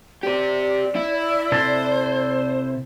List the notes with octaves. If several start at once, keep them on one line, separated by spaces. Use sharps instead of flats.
G4 C5 D5
E4
C3 E4 A4 C5